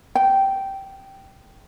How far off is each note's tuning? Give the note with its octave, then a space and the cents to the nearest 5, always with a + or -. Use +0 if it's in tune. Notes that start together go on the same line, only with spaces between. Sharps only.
G5 -10